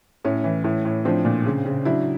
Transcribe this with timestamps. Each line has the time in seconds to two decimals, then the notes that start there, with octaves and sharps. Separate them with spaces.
0.25 A2 C#4
0.44 E3
0.64 A2
0.85 A2
1.05 F3 C4 D4
1.25 A#2
1.46 C#3
1.66 C#3
1.85 F#3 D4 E4